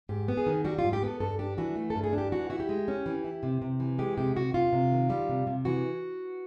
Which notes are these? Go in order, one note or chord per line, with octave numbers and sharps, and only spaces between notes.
G#2 G4
B3
G#4
D#3
G3 F#4
F4
G#2
G4
B3 A4
G2 A4
D4 G4
E3 F#4
A3
G2 A4
G#4
D4
G4
E3 F#4
E4 F#4
G4
G#3
C#4
E3
E4
C3
C3
E3
G#3 G4
C3 G4
C3 F#4
C3 F4
C3
D#3
G3
C3
C3
E3 F#4